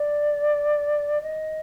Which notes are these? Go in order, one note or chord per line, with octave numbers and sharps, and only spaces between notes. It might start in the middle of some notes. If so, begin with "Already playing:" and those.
Already playing: D5
D#5